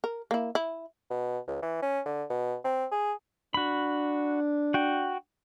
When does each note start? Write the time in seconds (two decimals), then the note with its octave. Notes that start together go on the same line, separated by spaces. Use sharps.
0.04 A#4
0.31 A#3 E4
0.55 E4
1.10 B2
1.47 C#2
1.62 E3
1.82 C#4
2.06 D3
2.30 B2
2.64 C4
2.91 G#4
3.54 D4 F#4 B5
4.74 F#4 G5